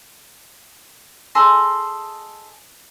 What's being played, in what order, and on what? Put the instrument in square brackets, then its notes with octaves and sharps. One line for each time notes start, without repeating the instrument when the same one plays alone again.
[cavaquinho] G#4 A4 D#5 C6